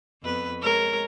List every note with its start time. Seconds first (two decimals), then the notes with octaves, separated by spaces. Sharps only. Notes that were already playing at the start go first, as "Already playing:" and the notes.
0.23 F2 B3 B4
0.61 G#3 A#4 C#5